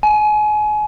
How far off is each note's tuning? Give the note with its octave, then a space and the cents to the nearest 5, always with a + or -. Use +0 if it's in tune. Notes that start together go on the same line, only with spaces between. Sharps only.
G#5 +30